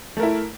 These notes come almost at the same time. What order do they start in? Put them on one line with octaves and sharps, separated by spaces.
A3 A#4 E4